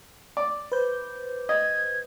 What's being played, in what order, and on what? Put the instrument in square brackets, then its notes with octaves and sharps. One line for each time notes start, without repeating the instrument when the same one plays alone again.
[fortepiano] D5
[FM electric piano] B4 C5 G6
[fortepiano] D#5 [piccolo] G#6